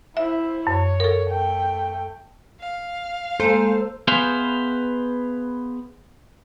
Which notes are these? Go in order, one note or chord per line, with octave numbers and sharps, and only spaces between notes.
E4 C5 E5
F#2 C#5
A4 A#4
A3 G5
F5
G#3 A#3 A4 C5 A#5
B3 G#4 B4 C5 E5 F5